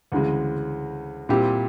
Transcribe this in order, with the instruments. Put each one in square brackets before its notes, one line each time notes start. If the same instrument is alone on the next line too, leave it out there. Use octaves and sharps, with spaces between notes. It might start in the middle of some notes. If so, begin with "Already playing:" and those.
[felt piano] D2 C#3 E3 G#3
A#2 G3 C4 E4 G4